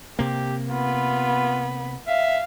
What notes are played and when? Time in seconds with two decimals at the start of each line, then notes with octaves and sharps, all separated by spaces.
0.19 C3 A#3 G4
0.71 B3 F4 B5
2.07 E5 F5